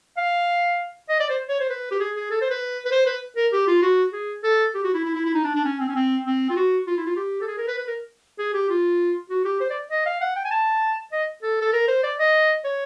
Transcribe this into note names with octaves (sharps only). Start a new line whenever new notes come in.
F5
D#5
D5
C5
C#5
C5
B4
G4
G#4
G#4
A4
C5
B4
B4
C5
B4
A#4
G4
F4
F#4
G#4
A4
G4
F#4
E4
E4
E4
E4
D#4
D4
D4
C#4
C4
C#4
C4
C4
F4
F#4
F4
E4
F4
G4
A4
G#4
A#4
B4
B4
A#4
G#4
G4
F4
F#4
G4
C5
D5
D#5
F5
F#5
G5
G#5
A5
D#5
A4
A4
A#4
C5
D5
D#5
C#5